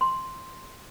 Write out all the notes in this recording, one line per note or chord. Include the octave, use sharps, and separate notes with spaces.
C6